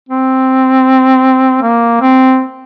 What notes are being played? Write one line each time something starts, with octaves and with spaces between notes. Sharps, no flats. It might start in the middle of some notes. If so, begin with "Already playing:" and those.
C4
A#3
C4